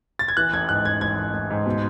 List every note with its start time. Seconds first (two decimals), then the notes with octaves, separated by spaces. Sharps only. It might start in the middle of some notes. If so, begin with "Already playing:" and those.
0.19 A6
0.28 G#6
0.37 E3 F#6
0.53 A1 G#6
0.69 G#2 F#6
0.85 A1 G#6
1.01 A1 G#6
1.18 A1
1.34 A1
1.50 G#2
1.66 B2